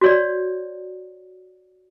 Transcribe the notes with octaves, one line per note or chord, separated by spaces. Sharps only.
F#4 C#5 D5